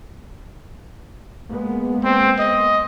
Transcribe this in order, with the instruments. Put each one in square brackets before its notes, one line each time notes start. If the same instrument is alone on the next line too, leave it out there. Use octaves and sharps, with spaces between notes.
[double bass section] G#3 A#3 B3
[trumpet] C4
D#5